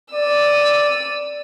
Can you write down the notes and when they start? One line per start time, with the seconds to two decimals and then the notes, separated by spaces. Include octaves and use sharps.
0.14 D5 E6 D#7